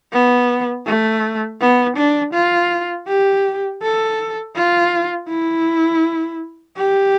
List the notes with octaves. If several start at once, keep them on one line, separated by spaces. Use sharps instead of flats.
B3
A3
B3
D4
F4
G4
A4
F4
E4
G4